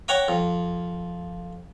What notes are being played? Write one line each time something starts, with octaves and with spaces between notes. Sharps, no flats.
C#5 F#5 G5 A#5 D6
F2